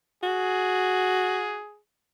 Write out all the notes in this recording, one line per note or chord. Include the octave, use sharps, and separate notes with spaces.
F#4 G#4